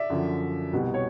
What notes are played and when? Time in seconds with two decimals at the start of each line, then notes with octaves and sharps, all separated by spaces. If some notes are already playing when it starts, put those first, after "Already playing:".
Already playing: D5 E5
0.10 F#2 D3 F3
0.73 C2 B2 G3
0.94 C#5